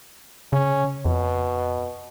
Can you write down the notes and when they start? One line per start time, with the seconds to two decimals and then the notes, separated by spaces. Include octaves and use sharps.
0.53 C#3 C#4
1.05 F2 B2